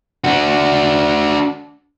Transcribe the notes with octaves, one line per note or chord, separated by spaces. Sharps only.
D4 F#4